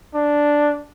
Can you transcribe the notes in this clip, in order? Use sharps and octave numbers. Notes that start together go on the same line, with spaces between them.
D4